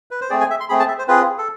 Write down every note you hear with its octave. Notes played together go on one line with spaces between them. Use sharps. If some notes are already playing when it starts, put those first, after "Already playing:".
B4
C5
A3 C4 G#4 D5
G#5
E5
C6
A3 C4 G#4 B5
A5
E5
C5
C4 F4 G#4 B4
A4